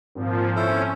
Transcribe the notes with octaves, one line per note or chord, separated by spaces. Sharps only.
G#1 A#2 F3
C#4 E4 A4 C5